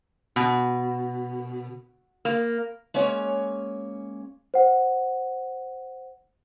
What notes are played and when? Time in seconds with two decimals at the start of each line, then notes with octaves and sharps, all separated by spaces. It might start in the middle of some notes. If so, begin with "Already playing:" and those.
0.36 B2
2.25 A#3
2.94 G#3 A#3 C#4 C#5
4.54 C5 F#5